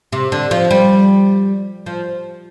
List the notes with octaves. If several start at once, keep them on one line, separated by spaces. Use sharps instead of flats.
C3
D3
F3
G3
F3